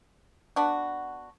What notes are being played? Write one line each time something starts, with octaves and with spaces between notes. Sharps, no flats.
B3 D4 F#4